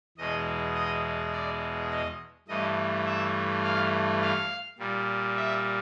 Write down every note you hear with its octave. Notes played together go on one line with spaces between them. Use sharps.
E2 B2 G#3 D#5
D#5
D5
D#5
G2 E3 A3 D#5
E5
F5
F5
A#2 G3
E5